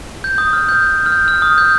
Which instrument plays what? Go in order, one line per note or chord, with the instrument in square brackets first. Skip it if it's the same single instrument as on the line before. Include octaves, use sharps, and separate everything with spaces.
[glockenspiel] G6
D#6
F6
G6
F6
G6
F6
D#6
G6